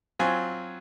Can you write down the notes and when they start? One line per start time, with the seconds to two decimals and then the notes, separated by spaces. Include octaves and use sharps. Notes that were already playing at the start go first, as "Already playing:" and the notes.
0.19 F#3 C4 F4 G#5